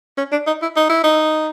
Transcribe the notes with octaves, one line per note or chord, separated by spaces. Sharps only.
C#4
D4
D#4
E4
D#4
E4
D#4